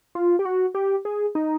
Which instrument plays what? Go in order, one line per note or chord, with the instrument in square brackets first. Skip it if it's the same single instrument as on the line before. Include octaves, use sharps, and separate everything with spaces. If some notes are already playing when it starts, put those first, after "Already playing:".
[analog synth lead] F4
G4
F#4
G4
G#4
D#4